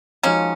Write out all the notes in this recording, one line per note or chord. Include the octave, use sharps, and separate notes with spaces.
F3 G#3 A#3 C#4 D#4 F#4